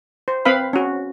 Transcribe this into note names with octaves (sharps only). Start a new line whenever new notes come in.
C5
C4 B4 F5 B5
C#4 F#4